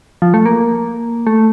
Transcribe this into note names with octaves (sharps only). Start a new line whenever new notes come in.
F3
A3
A#3
A3